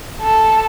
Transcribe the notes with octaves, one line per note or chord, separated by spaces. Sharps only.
A4